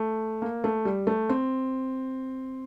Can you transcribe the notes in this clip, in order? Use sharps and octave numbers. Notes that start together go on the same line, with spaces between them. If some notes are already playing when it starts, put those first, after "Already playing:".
Already playing: A3
A#3
A3
G3
A3
C4